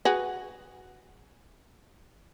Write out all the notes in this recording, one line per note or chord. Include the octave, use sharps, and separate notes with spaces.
F#4 G#4 B4